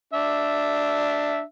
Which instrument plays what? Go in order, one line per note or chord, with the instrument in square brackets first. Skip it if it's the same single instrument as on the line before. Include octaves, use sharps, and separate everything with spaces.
[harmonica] D4 E5